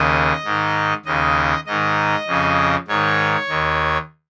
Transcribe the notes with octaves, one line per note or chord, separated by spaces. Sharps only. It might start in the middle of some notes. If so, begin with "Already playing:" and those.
Already playing: D#2 C#3 D#5
G#2 D#3
D#2 C#3 D#5
G#2 D#3 D#5
F2 C#3
G#2 D#3 C#5
D#2 D#3